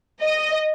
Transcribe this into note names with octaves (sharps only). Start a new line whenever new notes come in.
D#5